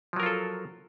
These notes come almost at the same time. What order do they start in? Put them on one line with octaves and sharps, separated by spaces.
F3 F#3 A#4 F4 A4